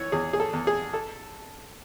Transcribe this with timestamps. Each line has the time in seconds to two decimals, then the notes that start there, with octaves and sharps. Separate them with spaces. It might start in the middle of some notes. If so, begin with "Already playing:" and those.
Already playing: E3 C#5
0.12 E2 G#4
0.33 G#4
0.40 A4
0.53 E2
0.67 G#4
0.94 A4